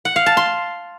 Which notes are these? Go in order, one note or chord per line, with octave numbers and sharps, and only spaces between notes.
F#5
F5
A5
C6